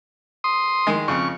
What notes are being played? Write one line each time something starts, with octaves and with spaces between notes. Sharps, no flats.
C6 D#6
D#3 G#3
F2 C#3 C#6